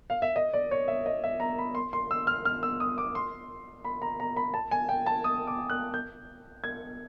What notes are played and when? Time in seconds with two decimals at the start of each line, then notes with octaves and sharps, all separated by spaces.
0.10 F5
0.22 E5
0.36 D#5
0.53 D5
0.71 C#5
0.88 E5
1.06 D#5
1.24 E5
1.40 A#5
1.58 B5
1.75 C6
1.93 C6
2.11 E6
2.27 F6
2.45 F6
2.63 E6
2.80 D#6
2.98 D6
3.15 C6
3.84 B5
4.02 A#5
4.20 A#5
4.36 B5
4.54 A5
4.71 G#5
4.89 G5
5.06 A5
5.24 D#6
5.47 D6
5.70 F#6
5.94 G6
6.64 G#6